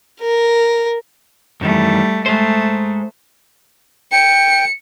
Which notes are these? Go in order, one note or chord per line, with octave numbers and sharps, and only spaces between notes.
A#4
F#2 D#3 E3 G3 A3
G#3 A3 C5
G5 C#7